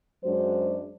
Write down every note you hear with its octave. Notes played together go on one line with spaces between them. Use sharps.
F#2 F#3 G#3 D4 F#4 C5